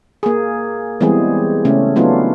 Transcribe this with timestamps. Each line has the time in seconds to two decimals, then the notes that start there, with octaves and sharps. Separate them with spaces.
0.23 A#3 G#4
1.01 E3 G3 G#3 B3 C4 G#4
1.65 C#3 A3 C#4
1.96 F#3 A3 B3 D4 D#4 F4